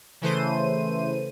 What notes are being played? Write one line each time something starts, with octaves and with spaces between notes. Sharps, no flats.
C#3 E3 A3 C5 D#7